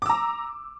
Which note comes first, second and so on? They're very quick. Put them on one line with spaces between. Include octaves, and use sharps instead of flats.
D6 E6 A#5